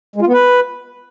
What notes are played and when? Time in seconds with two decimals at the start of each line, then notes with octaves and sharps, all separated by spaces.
0.16 G#3
0.22 F4
0.27 B3
0.33 B4